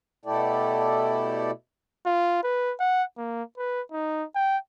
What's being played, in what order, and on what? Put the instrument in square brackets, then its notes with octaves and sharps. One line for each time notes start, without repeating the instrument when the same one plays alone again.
[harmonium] B2 A3 E4 G4 A4 D5
[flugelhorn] F4
B4
F#5
A#3
B4
D#4
G5